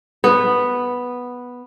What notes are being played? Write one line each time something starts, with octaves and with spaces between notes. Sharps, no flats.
B3